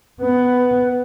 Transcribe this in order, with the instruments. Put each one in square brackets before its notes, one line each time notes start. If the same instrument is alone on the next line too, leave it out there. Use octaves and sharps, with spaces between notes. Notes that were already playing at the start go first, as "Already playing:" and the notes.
[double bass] B3 [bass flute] B4